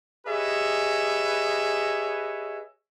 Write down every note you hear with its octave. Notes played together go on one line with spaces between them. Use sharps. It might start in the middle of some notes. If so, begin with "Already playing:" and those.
G4 G#4 B4 C#5 D#5 E5